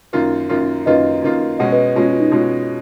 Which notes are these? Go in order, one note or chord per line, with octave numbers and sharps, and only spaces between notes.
F#2 D#3 A#3 F4
F#2 D#3 A#3 F4
F#2 D#3 A#3 F4 B4 D#5
F#2 D#3 A#3 F4
B2 G#3 C#4 D#5 F#5
B4 D#5
B2 G#3 C#4 F4
F4
D#4
B2 G#3 C#4 F4